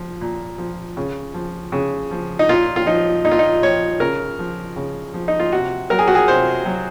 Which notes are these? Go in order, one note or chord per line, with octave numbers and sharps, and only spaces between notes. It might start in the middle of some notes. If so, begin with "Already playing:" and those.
Already playing: F3
A#2
F3
C#3
F3
C#3
F3
D#4
A#2 F4
F4
F3 D#4
A#2 D#4
F4
D#4
F3 C#5
C#3 A#4
F3
C#3
F3
D#4
F4
C3 F#4
F#3 A#4
G#4
F#4
G#4
C3 C5
F#3